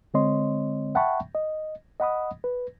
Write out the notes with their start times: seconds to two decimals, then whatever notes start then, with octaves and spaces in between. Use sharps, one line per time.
0.14 D3 G#3 C4 C#5 D#5 C6
0.95 E5 F#5 G5 A5 B5 C#6
1.35 D#5
2.00 D#5 F#5 B5 D#6
2.44 B4